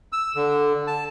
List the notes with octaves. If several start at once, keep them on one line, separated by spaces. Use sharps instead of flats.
E6
D3
A5